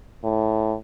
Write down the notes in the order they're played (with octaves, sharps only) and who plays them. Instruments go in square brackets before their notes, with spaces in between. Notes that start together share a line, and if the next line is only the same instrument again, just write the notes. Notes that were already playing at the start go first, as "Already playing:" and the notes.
[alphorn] A2